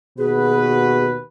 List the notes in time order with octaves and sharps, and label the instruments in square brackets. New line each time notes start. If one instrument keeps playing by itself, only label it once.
[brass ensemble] D#2 F#4 B4 [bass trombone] B2 [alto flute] G#4